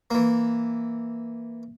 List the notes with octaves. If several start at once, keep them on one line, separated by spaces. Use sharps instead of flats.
E3 A#3